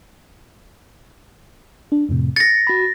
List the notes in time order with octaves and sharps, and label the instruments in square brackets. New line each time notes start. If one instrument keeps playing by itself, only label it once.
[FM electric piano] D4
F2 A2 C3
[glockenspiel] A6 A#6 [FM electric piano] C#7
[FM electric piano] F#4 B5